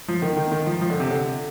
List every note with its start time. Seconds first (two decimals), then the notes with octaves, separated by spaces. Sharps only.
0.08 F3
0.22 D#3
0.37 D#3
0.52 D#3
0.66 F3
0.81 F3
0.90 D3
1.00 C3
1.10 D3